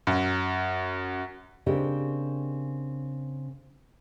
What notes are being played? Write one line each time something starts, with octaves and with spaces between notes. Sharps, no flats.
F#2
C#3 C4 D4 G4 A#4 D#5